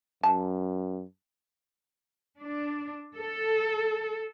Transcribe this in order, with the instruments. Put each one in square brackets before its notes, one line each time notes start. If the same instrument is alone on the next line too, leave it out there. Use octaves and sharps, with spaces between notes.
[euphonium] F#2 [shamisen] A5
[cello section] D4
A4